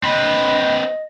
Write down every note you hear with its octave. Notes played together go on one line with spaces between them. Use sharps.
C4 B4 D#5